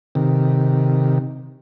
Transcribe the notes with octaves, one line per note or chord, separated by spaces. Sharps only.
C3 D#3